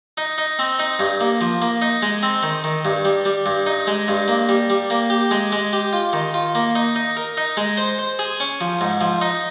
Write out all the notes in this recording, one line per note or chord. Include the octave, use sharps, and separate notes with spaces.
D#4
D#4
C4
D#4
G2
A#3
F3
A#3
D#4
G#3
C4
D#3
D#3
G2
G3
G3
G2
D#4
G#3
G2
A#3
G3
G3
A#3
G4
G#3
G#3
G4
F4
D#3
F4
A#3
D#4
D#4
A#4
D#4
G#3
C5
C5
G#4
C#4
F3
G#2
F3
D#4